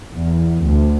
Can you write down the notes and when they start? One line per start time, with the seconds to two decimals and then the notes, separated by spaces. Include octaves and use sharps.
0.13 E2
0.64 D2